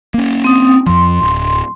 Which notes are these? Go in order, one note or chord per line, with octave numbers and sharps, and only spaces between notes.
A#3 C#4
C4 D#6
F2 F3 C6
D1